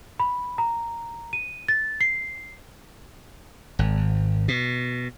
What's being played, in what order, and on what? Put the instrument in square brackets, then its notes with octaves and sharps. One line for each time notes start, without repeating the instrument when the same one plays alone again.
[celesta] B5
A#5
D#7
A6
C7
[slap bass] G#1
B2